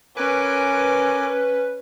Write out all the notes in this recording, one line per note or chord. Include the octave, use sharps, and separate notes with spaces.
C#4 A#4 B4 G#5 D6